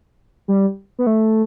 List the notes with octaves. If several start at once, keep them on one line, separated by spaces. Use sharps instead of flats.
G3
B3
A3